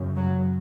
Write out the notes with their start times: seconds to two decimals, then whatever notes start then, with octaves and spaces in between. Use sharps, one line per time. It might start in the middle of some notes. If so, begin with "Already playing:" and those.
Already playing: F#2 C#3
0.16 F#3